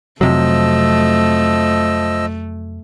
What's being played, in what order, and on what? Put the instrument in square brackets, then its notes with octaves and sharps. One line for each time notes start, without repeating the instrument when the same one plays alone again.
[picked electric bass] F2 C3 F#3 [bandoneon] F3 D#5 E6 [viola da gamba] A3